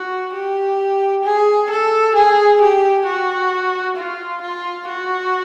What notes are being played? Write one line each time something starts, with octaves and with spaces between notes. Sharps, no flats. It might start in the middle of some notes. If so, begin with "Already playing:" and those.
Already playing: F#4
G4
G#4
A4
G#4
G4
F#4
F4
F4
F#4